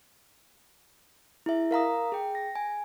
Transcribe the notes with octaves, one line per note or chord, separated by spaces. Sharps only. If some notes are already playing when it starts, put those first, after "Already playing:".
E4 G#4 E5
A#4 F5 A#5 D#6
G#4 G5
A#6
G#5